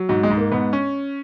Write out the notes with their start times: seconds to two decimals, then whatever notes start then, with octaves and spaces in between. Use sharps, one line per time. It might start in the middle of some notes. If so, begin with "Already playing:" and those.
Already playing: F#3
0.09 G#2 F#4
0.23 G#3
0.30 G#2
0.37 A#3
0.52 G#2 B3
0.73 C#4